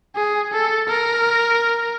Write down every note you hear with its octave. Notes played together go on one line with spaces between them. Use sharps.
G#4
A4
A#4